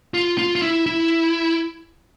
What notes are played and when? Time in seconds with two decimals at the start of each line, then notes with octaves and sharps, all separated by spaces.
0.14 F4
0.38 F4
0.55 F4
0.62 E4
0.86 E4